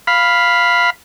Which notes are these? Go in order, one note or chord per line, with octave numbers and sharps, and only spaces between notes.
F5 B5